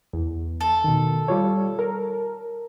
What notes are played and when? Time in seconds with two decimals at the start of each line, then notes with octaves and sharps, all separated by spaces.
0.13 E2
0.61 A4
0.84 B2 D#3
1.28 G3 F4 C#5
1.79 A#4